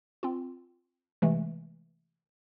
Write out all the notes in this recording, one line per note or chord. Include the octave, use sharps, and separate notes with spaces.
C4 F4
C3 E3 G#3 A3